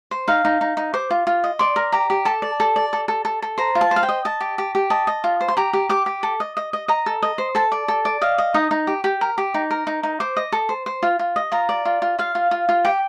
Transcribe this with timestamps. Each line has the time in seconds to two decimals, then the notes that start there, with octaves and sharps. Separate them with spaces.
0.11 C5
0.28 D#4 F5
0.45 D#4
0.61 D#4
0.77 D#4
0.94 C5 D6
1.11 F4
1.27 F4
1.44 D#5
1.59 D5 C6
1.76 A#4
1.92 G4 A#5
2.10 G4
2.25 A4 A5
2.42 D5
2.60 A4
2.76 D5
2.93 A4
3.08 A4
3.25 A4
3.42 A4
3.58 C5 A#5
3.75 F4
3.81 A5
3.91 C5
3.96 F5
4.03 G5
4.09 D#5
4.25 D#5 A5
4.41 G4
4.58 G4
4.75 G4
4.90 D#5 A5
5.07 D#5
5.24 F4
5.41 C5
5.48 C6
5.57 G4 A#5
5.73 G4
5.89 G4 D6
6.06 G4
6.23 A4
6.40 D#5
6.57 D#5
6.73 D#5
6.88 D#5 A#5
7.06 A4
7.23 D#5
7.38 C5
7.55 A4 A5
7.72 D5
7.88 A4
8.05 D5
8.22 D#5 F5
8.38 D#5
8.54 D#4 D#6
8.71 D#4
8.87 G4
9.04 G4
9.21 A#4
9.38 G4
9.54 D#4
9.71 A#4
9.87 D#4
10.03 D#4
10.20 C5 D6
10.37 D#5
10.52 A4
10.69 C5
10.86 C5
11.03 F4
11.19 F4
11.36 D#5
11.52 F4 A#5
11.69 D5
11.85 F4
12.02 F4
12.19 F4 F5
12.35 F4
12.51 F4
12.69 F4
12.85 G4 G5